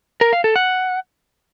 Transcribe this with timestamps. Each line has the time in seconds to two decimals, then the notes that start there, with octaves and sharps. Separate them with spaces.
0.21 A#4
0.33 F5
0.44 A4
0.56 F#5